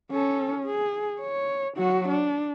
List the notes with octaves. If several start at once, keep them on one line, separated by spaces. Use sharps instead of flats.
C#4 A4
G#4
C#5
F#3 F#4
D4